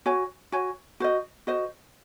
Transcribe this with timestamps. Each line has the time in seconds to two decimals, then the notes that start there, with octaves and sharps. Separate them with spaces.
0.06 F#4 C#5 G#5
0.52 F#4 C#5 G#5
1.00 F#4 C5 D#5
1.47 F#4 C5 D#5